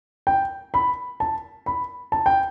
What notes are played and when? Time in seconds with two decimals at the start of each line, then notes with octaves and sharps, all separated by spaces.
0.27 G5
0.74 B5
1.20 A5
1.66 B5
2.12 A5
2.26 G5